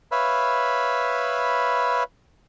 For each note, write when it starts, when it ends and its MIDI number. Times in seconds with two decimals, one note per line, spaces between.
0.12 2.03 71
0.12 2.03 73
0.12 2.03 76
0.12 2.03 77
0.12 2.03 83